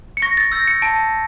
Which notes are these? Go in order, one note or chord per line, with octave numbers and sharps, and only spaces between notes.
C#7
C#6 A#6
A6
E6 G6 A#6
C#7
A5 D7